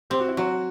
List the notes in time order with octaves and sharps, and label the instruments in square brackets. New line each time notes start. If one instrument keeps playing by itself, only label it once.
[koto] C4 [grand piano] G4
[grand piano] F#4
E4
[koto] F#3 [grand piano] F#4